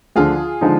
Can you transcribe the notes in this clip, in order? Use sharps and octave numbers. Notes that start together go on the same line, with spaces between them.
D2 D3 F3 F4 G#4
D3 F3 G#3 D#4